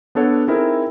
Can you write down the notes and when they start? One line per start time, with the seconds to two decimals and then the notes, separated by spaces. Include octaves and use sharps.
0.15 B3 D4 A4 C#5 F#5
0.48 C4 D#4 E4 G#4 A#4